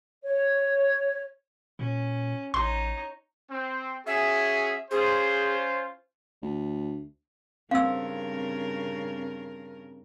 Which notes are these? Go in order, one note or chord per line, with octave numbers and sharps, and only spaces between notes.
C#5
A#2 C#4
A1 D#4 C#5 C6
C4
C#4 F#4 G#4 E5
C#4 F4 G#4 C5
D2
G2 C#3 C4 A#4 F5 E6